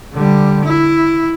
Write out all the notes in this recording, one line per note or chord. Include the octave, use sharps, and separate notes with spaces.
D3 G3
E4